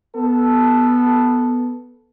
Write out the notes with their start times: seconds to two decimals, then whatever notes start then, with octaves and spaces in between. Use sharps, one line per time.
0.15 B3 A4